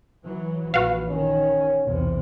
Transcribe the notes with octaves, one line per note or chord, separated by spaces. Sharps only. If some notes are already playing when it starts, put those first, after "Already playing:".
E3 F#3
A#1 E3 F#4 B4 F5
D#3 C#4
B1 E2 C3